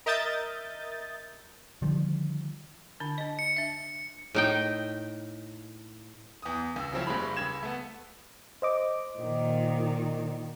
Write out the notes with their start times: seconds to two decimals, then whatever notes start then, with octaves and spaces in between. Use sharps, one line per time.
0.06 A#4 D#5 E5 D#6 G6 A6
1.82 D3 D#3 F3 G3
3.00 D3 D4 B5
3.18 D4 D#5
3.39 C#7
3.57 D4 E5
4.35 A2 D#4 G5
6.42 E2 D#6
6.76 C#2 E6
6.93 C#3 F3 F#3 C4 C#4 E4
7.07 F#1 G3 G#3 C#5 B5
7.36 C#2 B5 G#6 E7
7.63 A3 B3
8.62 C5 D#5 D6
9.19 A#2 D#3